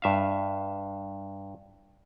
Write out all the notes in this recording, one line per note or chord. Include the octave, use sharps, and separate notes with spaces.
G2 E5 F5